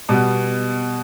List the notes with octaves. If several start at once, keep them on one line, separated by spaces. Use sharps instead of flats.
B2 G3 B3